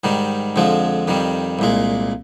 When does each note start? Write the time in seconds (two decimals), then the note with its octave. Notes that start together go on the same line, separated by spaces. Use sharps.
0.04 G#2 D#3 G3
0.56 F2 D3 F3 G#3
1.08 F2 D#3 G3
1.59 C2 A#2 G#3